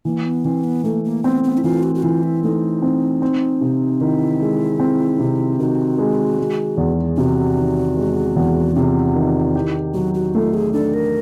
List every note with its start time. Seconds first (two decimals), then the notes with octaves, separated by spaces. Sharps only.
0.05 E3 A#3
0.25 B3
0.45 E3 C4
0.64 B3
0.84 A3 A#3
1.04 A#3
1.23 B3 C4
1.44 B3
1.58 E4
1.64 E3 F4
1.83 F#4
1.95 F#4
2.02 E3 F4
2.23 E4
2.43 A3 D#4
2.82 C4
3.22 C4
3.61 C3
4.00 D#3 E4
4.40 G#3
4.79 C4
5.19 C3
5.59 D#3 F#4
5.98 G#3
6.38 G#3
6.77 E2
7.17 C3 F#4
7.57 D#3
7.97 G#3
8.36 E2
8.75 C3 F4
9.15 D#3
9.55 E4 G4
9.94 F#3 F#4
10.14 F#4
10.34 A3 F4
10.54 G#4
10.73 D4 A4
10.94 A#4